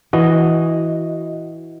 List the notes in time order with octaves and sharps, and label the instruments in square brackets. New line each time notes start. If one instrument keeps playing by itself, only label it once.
[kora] E3 [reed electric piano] F#4 D#5